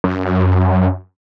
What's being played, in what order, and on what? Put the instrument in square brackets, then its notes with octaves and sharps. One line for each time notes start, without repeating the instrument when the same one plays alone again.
[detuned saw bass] F#2